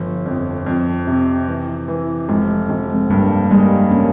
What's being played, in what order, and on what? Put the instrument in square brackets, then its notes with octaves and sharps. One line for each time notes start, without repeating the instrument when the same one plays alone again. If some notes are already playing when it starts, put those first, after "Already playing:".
Already playing: [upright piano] G1 [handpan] F3
[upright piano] F2
F2
C3
E3
E3
[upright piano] F1 [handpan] G#3
[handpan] G#3
[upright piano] F1
[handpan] G#3 C4
[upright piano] G2 [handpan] G3 A#3
[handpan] G3 A#3 [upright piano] G#3
[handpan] A#3 C#4